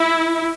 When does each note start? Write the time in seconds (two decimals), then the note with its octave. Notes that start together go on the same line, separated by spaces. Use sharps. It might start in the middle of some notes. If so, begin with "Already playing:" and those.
Already playing: E4